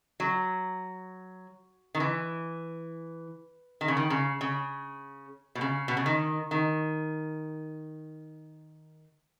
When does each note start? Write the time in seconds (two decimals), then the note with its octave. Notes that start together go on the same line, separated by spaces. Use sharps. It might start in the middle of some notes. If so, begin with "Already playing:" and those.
0.20 F#3
1.95 D#3
2.00 E3
3.81 D#3
3.88 C#3
3.97 D#3
4.10 C#3
4.41 C#3
5.55 B2
5.61 C#3
5.88 B2
5.97 C#3
6.06 D#3
6.51 D#3